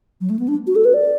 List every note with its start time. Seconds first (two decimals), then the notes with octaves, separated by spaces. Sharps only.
0.21 F#3
0.30 A3
0.39 B3
0.48 D4
0.67 F#4
0.76 A4
0.85 B4
0.94 D5